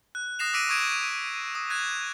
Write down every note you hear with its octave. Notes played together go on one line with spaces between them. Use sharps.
F#6
D#6 F#6 A#6 C7 E7 F7
D6 E6 A#6 B6 D7 D#7
C#6 D#6 G#6 D7 E7
D#6
F#6 G#6 A#6 E7